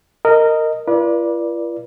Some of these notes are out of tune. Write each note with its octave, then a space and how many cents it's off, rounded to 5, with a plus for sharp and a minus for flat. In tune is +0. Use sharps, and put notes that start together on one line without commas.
A#4 -20 D#5 +0
F4 -45 B4 -40 D5 +0